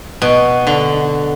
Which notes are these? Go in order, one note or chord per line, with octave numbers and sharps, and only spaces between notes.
B2
D3